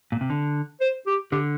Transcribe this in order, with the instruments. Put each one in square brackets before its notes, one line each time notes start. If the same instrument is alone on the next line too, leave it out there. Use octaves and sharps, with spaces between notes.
[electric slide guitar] A#2
C3
D3
[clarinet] C5
G4
[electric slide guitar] D3 [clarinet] G4